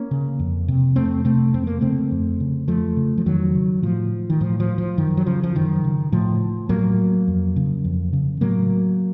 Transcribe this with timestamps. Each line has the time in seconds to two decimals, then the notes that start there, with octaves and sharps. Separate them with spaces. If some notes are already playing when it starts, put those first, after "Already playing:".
Already playing: A#3 C#4
0.11 C#3
0.39 F2
0.68 C3
0.96 F2 A3 C4
1.25 C3 A3 C4
1.54 F2 C4
1.67 A#3
1.81 C#3 A3 C4
2.11 F2
2.40 C#3
2.68 F2 F3 A3
2.97 C#3
3.18 F3
3.26 F2 D#3 F#3
3.55 C#3
3.82 A2 F3
4.30 D#3
4.41 A2 F3
4.60 F3
4.78 F3
4.97 F#2 D#3
5.17 F#3
5.26 C#3 F3
5.43 F3
5.55 F#2 D#3
5.84 C#3
6.12 A2 F3
6.69 A2 F#3 A#3
7.28 F2
7.56 C#3
7.84 F2
8.13 C#3
8.41 A2 F#3 A#3